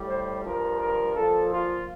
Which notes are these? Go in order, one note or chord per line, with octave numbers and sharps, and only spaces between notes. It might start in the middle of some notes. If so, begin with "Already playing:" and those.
Already playing: A2 G3
C5
G2 F3 A#4
A#4
A#2 F3 A4
F4